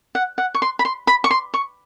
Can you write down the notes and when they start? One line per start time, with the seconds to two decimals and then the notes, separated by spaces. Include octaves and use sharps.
0.15 F#5
0.38 F#5
0.55 C#6
0.62 C6
0.79 B5
0.85 C6
1.07 B5
1.24 C#6
1.31 C6
1.54 C#6